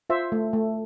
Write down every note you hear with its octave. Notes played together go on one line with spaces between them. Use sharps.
F4 C5 E5
A3
A3